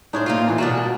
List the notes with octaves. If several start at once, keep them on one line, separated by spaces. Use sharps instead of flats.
A2 D4 D#4 G#4 C5
A#3 C4 F4
A#2 E3 A#4
B2 D4 F#4 A#4
A#3